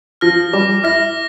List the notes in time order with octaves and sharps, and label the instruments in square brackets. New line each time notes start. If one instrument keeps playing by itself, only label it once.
[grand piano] F3 [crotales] F6 A#6
[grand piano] G3 [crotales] D6
[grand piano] E4 [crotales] F6 A#6